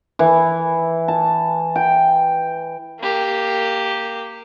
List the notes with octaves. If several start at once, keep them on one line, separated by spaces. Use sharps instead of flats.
E3
A5
G5
A#3 G4